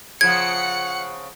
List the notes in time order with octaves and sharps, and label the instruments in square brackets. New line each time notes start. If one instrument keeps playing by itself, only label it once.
[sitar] C#3 F3 [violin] F#5 C#7 [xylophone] G#6